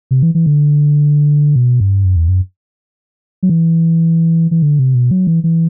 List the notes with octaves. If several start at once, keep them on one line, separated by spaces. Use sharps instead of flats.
C3
E3
E3
D3
B2
G2
F#2
E2
F#2
F#3
E3
E3
D3
C3
B2
F#3
E3
E3